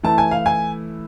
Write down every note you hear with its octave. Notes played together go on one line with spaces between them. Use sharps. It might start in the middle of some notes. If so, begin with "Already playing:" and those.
E3 A3 E4 A5
G#5
F5
G#5